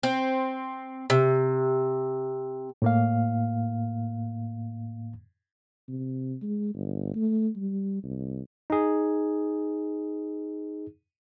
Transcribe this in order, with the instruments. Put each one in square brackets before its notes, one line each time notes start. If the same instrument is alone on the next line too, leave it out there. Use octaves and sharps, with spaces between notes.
[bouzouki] C4
C3
[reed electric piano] A2 A#3 F5
[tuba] C3
G#3
G1
A3
G3
C2
[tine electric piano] D#4 G#4